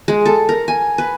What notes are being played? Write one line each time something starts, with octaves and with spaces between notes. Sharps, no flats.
G#3
A4
A#4
G#5
B4